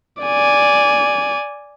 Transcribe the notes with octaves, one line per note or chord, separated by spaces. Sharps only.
D5 G#5